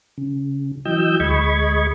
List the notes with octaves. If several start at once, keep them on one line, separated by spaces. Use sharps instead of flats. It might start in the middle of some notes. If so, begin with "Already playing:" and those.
C#3
E3 F#3 D#5 G5 E6 G6
D2 G#3 D#5 B5 C#6 G#6